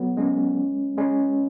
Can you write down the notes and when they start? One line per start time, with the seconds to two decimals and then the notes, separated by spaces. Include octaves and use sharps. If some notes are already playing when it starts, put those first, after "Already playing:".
Already playing: F#3 B3
0.17 G#3 C#4
0.98 G#3 C#4